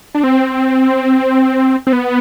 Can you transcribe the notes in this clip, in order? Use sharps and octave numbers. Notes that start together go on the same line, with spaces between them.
D4
C4
C4
B3